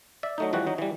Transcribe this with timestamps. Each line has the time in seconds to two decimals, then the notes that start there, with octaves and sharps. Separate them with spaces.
0.23 D5 E5
0.38 F#3 A3 D#4
0.53 E3 F3 G3 F#4
0.67 F#3 D#4
0.78 E3 G3